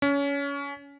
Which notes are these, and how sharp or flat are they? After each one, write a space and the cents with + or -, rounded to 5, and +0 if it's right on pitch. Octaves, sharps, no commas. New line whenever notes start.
C#4 +25